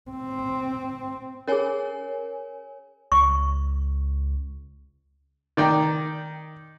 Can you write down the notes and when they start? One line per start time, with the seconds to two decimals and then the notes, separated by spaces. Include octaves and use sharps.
0.11 C4
1.48 C#4 G#4 A#4 C#5 G#5
3.12 C#2 C#6
5.57 D#3 D5 G5 A#5